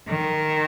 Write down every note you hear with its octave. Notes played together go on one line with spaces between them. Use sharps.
D#3